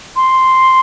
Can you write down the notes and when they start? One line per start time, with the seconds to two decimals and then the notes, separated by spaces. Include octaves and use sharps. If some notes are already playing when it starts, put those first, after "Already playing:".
0.16 C6